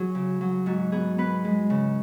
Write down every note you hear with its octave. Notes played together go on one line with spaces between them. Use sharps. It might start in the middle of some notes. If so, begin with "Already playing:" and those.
Already playing: F#3 G#4
C#3
F#3
G#2 F#4
B3 G#4
B3 B4
G#3
C#3